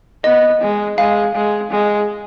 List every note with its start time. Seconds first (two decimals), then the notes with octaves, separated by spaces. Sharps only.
0.24 B3 D#5
0.61 G#3
0.98 G#3 F5
1.35 G#3
1.71 G#3